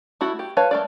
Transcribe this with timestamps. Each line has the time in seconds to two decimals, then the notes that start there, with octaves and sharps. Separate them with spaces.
0.21 A3 E4 F#4
0.39 G4
0.57 B4 C#5 F5 A5
0.71 A3 A#4 D5